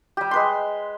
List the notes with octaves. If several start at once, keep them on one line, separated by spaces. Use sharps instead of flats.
G3 G4
G#3 B4 C6